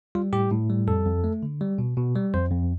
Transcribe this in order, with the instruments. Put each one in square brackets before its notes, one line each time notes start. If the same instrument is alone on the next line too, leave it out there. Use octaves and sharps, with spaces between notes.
[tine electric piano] G3 F4
A2 G4
A2
G3
F2 A4
F2
A3
D3
G3
B2
B2
G3
F2 C5
F2